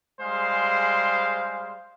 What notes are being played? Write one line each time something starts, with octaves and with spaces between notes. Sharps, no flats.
G3 G#3 G#4 C5 F5